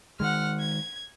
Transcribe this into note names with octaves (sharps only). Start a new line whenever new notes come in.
D#3 G#3 F#5 F6
G#6